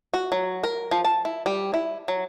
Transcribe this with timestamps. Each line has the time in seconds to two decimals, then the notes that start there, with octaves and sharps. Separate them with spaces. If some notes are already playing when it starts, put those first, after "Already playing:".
0.14 F#4
0.32 F#3
0.63 A#4
0.91 F3
1.04 A5
1.25 E4
1.46 G3
1.74 E4
2.08 F#3